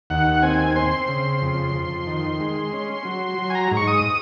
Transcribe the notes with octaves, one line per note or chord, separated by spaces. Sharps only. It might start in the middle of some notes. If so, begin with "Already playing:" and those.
D#2 F#5
C4 G#5
C4 C6
C#3
F2
F2
D#3
G#3
C#4
F#3
F#3
G#5
A#5
G#2
C#6
D#6